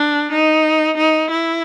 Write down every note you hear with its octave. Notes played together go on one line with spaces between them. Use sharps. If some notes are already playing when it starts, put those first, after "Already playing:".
Already playing: D4
D#4
D#4
E4